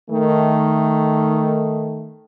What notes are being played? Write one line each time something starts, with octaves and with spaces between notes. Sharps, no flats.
D#3 A3